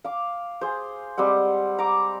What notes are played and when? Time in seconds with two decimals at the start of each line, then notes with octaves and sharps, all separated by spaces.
0.04 F5 D6
0.61 G#4 C5
1.17 G3 G#3 C4 F#5
1.79 A#5 D6